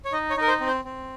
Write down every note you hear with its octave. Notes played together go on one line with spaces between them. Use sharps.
C#5
D#4 D#5
C#5
D#4 A#4
C5
C4
C5
C4